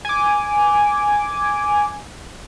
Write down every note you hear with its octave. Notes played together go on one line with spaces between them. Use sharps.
G#5 D6